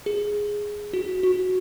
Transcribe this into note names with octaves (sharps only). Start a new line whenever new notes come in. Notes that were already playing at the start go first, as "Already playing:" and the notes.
G#4
F#4
F#4